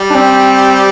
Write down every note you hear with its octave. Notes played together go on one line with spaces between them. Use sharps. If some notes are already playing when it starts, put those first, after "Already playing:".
Already playing: G3 G4
D4
C4